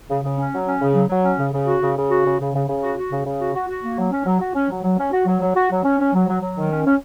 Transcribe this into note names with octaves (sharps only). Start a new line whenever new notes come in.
C#3
C#3
C#4
F#3
C#4
C#3
F#3
F#3
C#4
C#3
C#3
F#4
C#3
C#3
F#4
C#3
C#3
C#3
C#3
F#4
F#4
C#3
C#3
F#4
F#4
F#4
A#3
F#3
C#4
F#3
F#4
C#4
F#3
F#3
C#4
F#4
F#3
F#3
F#4
F#3
C#4
C#4
F#3
F#3
F#3
D#3
C#4
C#4